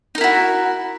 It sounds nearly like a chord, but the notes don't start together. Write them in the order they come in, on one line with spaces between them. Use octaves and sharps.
D#4 A#4 E4 F#4